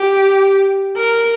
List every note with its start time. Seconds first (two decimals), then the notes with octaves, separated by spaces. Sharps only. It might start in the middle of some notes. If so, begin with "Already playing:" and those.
Already playing: G4
0.97 A#4